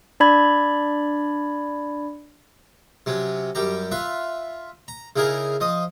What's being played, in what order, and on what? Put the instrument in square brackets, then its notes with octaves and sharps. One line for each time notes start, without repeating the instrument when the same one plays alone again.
[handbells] D4 D5 B5 G#6
[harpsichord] C3 F#3 C#4
F#2 G3 G4 A#5
F4 B4 E5
A#5
C#3 D#4 E4 G#4 A#4 A#5
F3 D#5 D#6